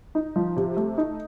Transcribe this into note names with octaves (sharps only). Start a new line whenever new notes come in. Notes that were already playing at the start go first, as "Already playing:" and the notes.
D#4
F3
C3
A3
D#4